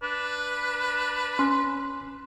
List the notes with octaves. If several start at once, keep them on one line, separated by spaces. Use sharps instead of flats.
D4 B4
C#4 C6